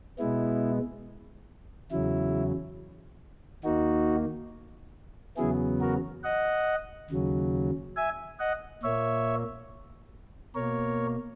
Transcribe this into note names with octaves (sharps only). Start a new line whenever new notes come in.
B2 G#3 B3 E4
E2 C#3 F#3 E4
D#2 D#3 A#3 D#4 F#4
E2 C#3 F#3 B3 E4 G#4
F#4 A#4
D#5 F#5
D#2 C#3 F#3
E5 G#5
D#5 F#5
A#2 A#3 C#5 E5
B2 A#3 A#4 C#5